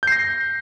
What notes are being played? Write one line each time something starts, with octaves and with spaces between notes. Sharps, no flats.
G6 A#6 C7